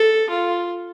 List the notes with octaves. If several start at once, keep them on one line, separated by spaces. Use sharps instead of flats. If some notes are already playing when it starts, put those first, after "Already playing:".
Already playing: A4
F4